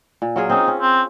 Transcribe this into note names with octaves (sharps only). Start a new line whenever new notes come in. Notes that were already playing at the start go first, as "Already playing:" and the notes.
A#2
F#3 F4 G#4
C4 C#4 D#4
C#4
C4